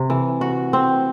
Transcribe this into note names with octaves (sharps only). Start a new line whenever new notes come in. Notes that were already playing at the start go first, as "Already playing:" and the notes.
Already playing: C3
E3
F#4
C4